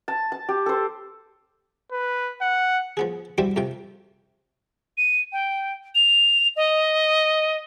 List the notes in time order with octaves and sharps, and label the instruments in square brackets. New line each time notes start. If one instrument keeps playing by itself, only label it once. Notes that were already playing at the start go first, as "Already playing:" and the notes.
[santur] A5
A5
G4
A4 C5
[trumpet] B4
F#5
[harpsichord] F3 B3 G#4
G3 C4 E4 F#4 G4 D5
F2 C3 F3 G5
[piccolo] D#7
G5
F7
D#5